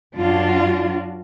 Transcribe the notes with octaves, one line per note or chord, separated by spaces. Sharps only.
F#2 D4 F4 F#4